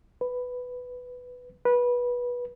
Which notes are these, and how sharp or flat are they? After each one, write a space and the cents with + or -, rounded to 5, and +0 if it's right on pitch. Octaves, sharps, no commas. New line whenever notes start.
B4 +5
B4 -20